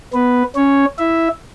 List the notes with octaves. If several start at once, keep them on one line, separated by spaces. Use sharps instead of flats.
B3 B4
C#4 C#5
E4 E5